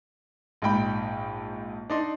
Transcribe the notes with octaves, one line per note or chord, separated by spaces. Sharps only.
A#1 G#2 G5 B5
D4 D#4 C6